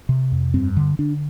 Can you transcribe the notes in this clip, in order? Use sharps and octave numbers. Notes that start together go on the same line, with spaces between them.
C3
F2
G2 C4
D3
D3 D4